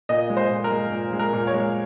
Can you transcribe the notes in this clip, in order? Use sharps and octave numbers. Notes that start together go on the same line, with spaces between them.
A#2 D#5
G#3
C5
A#2
A#4
G#3
A#2
G#3
A#4
A#2
C#5
G#3